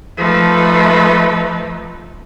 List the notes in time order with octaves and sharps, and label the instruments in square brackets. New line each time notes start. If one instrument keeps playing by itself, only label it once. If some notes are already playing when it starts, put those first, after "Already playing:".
[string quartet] F3 A3 D#4 B4